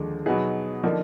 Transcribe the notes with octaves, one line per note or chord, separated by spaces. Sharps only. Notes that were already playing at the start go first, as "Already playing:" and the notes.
Already playing: D#2 D3 F3 G#3
B2 F#3 B3 D#4 G#4
D3 F3 A#3 D#4